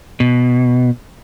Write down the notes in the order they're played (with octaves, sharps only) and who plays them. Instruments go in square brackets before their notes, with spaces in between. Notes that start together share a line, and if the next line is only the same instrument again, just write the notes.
[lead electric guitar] B2